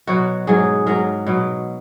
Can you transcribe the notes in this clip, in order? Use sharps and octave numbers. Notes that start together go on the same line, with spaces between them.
B2 F#3 F#4
G#2 F#3 G#4
G#2 F#3 A#4
B2 F#3